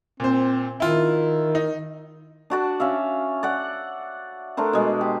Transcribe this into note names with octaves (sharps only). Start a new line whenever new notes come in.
A#2 C4 C5
D#3 E4 F4
D#4
D4 F#4 D5 A5
C#4 E5 F5
D5 F#5
A3 D4 A#4 C5
B2 G#3
G4